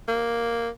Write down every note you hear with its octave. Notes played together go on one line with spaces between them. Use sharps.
A#3